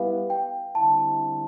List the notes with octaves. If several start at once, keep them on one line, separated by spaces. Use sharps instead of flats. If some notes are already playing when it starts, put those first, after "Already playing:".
Already playing: G3 B3 E4 G4 B4 F5
G5
D3 G3 C4 E4 A5